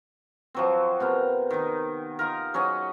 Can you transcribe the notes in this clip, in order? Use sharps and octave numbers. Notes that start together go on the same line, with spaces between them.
F3 F#3 C4
C3 B3 A#4
D#3 D#4
D#4 F4 A#4
F#3 C#4 G#4 D#5